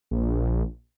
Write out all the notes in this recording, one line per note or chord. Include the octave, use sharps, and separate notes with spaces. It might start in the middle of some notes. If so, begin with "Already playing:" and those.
A#1